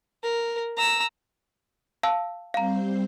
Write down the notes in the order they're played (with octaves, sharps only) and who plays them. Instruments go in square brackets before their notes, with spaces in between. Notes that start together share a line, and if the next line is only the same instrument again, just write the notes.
[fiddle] A#4
A#5 E6
[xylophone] F5 A5 E6
[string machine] G3 C4 C5 [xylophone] F5 A#5